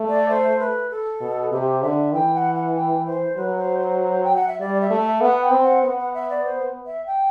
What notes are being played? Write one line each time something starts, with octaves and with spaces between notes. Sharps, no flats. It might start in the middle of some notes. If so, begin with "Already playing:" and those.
Already playing: A3
D5
C5
B4
A4
B2
C3 G4
D3 E5
E3 G5
F#5
F#5
G5
C5
F#3 B4
C5
C5
G5
F#5
E5
G3 D5
E5
A3
E5
B3 F#5
G5
C4
F#5
B3 F#5
F#5
E5
D5
C5
E5
G5